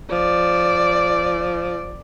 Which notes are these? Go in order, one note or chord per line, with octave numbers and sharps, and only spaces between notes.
F3 D5